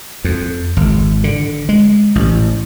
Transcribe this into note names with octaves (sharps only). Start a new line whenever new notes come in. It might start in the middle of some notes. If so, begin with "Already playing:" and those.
F2
G#1
D3
G#3
A1